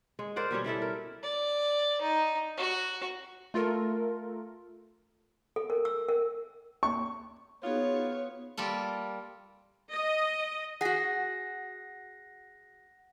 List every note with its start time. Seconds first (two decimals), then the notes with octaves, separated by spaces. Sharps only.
0.19 G#3 C#5
0.36 A#4 C5 D5 F#5
0.51 B2 G3 C#4 C#5
0.64 G3 E4 A4 E5
0.82 A#4
1.23 D5
2.01 D#4
2.57 F#4
3.54 A3 F4 A4 A#4
5.56 A4
5.70 A#4
5.85 E6
6.09 A#4
6.83 C#6
7.63 B3 D#4 F4 F#4 G#4 C#5
8.57 G3 A#3 F4 A4
9.92 D#5
10.81 F#4 G#4 F#5 A#6